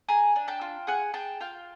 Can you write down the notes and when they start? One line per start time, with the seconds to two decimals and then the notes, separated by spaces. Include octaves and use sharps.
0.09 G#4 G#5 A#5
0.36 D4
0.48 G5 A5
0.61 F4
0.87 G#4 F#5 G#5
1.14 G#4 G5 A5
1.40 F4 F5 G5